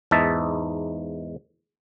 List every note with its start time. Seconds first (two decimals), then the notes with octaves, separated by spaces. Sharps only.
0.11 E2 G#2 D#4 E5 A5